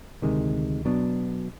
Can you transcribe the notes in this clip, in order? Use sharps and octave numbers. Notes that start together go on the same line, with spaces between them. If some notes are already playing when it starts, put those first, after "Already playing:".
D2 C3 D#3 G#3
B2 F#3 B3 D4